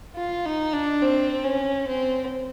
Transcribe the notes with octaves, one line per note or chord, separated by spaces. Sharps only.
F4
D#4
D4
C4
C#4
C4